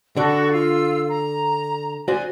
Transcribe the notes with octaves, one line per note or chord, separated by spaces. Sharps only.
D3 F#4 A4 D5
F4 E6
A#5
F#4 C5 D5 G#5